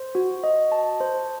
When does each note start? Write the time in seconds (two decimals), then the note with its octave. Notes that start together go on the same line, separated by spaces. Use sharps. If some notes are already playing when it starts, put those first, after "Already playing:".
Already playing: C5
0.15 F#4
0.44 D#5
0.72 A5
1.01 C5